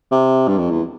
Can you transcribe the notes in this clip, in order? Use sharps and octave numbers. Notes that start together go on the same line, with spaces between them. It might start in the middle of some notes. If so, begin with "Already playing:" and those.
C3
G2
F2
E2